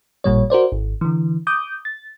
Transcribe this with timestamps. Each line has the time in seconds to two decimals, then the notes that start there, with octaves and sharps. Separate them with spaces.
0.24 A1 A#2 G3 C#5
0.50 F#4 A#4 C5 D5
0.72 G#1
1.01 D3 E3
1.47 D6 D#6 G6
1.85 A6